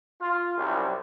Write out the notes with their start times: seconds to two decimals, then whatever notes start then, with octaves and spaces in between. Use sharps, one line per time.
0.21 F4
0.58 C2 F#2